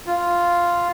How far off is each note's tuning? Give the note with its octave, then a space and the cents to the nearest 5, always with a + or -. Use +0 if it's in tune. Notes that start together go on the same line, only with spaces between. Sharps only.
F4 -5